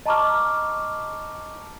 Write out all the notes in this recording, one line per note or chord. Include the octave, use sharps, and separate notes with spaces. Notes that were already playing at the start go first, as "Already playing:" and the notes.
D#5 A5 A#5 C#6 D6 F6